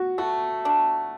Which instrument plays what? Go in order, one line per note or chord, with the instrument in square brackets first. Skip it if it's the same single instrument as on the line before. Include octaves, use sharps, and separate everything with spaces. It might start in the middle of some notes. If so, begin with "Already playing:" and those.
Already playing: [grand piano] F#4
[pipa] A3 [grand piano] F#4
[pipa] D4